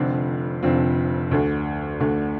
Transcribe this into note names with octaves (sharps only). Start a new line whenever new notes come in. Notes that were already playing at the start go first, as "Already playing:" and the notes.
Already playing: F1 F2 D3 F3 C4
F1 F2 D3 F3 C4
D2 D3 A3
D2 D3 A3